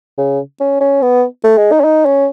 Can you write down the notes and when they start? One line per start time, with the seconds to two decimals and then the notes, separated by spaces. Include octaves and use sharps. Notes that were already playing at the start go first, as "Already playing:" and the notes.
0.18 C#3
0.60 C#4
0.81 C#4
1.02 B3
1.44 A3
1.58 G#3
1.72 D#4
1.80 C#4
1.84 D#4
2.06 C#4